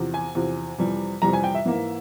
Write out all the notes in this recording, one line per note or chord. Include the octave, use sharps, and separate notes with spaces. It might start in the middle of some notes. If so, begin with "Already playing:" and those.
Already playing: E2 C3 F3
G#5
E2 C3 F3
F2 C3 E3 G3
F2 C3 E3 G3 A#5
G#5
G5
E5
G#2 E3 A#3